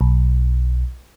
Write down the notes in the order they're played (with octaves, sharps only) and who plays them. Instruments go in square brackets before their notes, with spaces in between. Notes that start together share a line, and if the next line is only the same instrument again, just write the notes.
[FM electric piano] B1